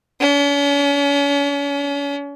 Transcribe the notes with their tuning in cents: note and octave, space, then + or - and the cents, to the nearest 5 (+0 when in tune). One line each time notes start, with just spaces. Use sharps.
C#4 +40